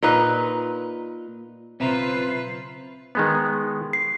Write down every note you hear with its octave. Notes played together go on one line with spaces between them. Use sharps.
A#2 D#4 B4
B1 C#3 C4 F4 B4 C5 E5 A#5
D#3 G#3 B3
C7